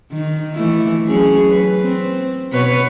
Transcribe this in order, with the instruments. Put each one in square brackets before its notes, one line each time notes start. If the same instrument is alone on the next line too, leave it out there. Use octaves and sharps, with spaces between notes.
[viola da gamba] D#3
E3 A3 E4
F#3 C#4 G#4
B4
C4
B2 B4 C#5